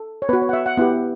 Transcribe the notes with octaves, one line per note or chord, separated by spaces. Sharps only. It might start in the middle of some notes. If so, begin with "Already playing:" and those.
Already playing: A4
C#5
B3 F#4 B4
C#5
F#5
E5
F#5
B3 E4 G4 F#5